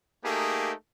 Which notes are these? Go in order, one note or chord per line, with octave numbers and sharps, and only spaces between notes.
A3 A#3 D#4 G4 G#4